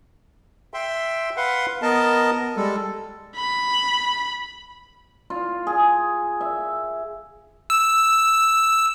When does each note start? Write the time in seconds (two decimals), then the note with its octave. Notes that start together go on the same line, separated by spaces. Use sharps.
0.74 E5 G5 C6
1.37 B4 F5 F#5 C6
1.82 B3 A#4 D#5 A5
2.56 G3 G#3 A4
3.36 B5
5.30 F4
5.67 G#4
6.41 E5
7.70 E6